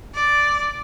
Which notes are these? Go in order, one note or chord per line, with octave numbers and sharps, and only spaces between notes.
D5